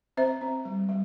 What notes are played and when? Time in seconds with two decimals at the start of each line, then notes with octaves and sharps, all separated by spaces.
0.17 C4 C5 E5
0.41 C4
0.65 G3
0.89 G3